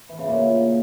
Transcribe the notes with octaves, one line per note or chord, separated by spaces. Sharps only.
E3
C#3
A#2